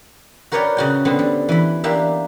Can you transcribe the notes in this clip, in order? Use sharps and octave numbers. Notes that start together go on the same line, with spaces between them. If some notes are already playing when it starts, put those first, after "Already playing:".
F#4 A#4 B4 C#5 D5 G5
C#3 F#4 G5
D3 B3 C4
G3
E3 B5
A#3 D4 G4 E5